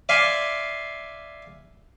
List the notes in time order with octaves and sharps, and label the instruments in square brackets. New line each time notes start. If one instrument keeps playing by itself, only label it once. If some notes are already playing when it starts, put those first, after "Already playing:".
[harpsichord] D5 E5 F5 G#5 C6